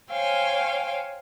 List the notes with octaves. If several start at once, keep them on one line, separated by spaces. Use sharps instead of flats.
C5 C#5 F5 G5 G#5